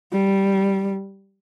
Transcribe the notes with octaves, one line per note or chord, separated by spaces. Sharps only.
G3